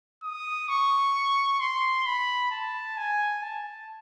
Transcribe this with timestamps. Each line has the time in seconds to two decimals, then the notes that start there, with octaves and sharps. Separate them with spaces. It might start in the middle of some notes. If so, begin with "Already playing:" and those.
0.23 D#6
0.69 C#6
1.60 C6
2.06 B5
2.51 A5
2.97 G#5
3.43 A5